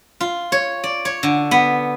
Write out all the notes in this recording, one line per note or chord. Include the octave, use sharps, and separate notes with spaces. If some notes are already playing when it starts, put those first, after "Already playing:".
F4
C#5
D5
C#5
D3
B3